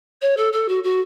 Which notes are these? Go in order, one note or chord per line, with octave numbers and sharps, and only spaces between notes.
C#5
A4
A4
F#4
F#4